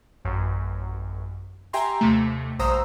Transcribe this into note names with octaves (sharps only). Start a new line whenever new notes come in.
A1 F#2
G4 E5 G5 G#5 A#5 C6
D#2 C3 A3
A#1 G2 C5 A#5 D#6 E6